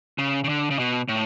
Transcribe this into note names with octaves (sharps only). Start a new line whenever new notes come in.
C#3
C#3
D3
C#3
B2
A2